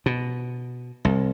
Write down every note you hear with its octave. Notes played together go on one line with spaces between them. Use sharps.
B2
C2